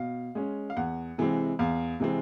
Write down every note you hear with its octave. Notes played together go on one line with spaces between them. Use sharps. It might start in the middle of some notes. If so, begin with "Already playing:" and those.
Already playing: B2 F5
G#3 C#4
F5
E2 F#5
C3 E3 G#3 C4
E2 F5
C3 E3 G#3 C4